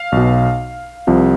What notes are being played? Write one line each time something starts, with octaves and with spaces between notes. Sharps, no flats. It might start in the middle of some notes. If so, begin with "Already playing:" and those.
Already playing: F5
B1 B2
C2 C3 F3